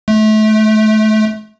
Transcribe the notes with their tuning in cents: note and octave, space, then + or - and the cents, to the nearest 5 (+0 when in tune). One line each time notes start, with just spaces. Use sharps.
A3 -30